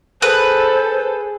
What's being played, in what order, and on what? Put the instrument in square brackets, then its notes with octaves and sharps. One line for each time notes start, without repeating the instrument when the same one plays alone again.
[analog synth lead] G#4 [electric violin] A4 [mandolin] B4 [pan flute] C5